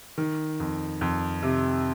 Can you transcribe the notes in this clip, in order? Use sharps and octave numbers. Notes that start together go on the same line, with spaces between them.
D#3
F2
F2
C3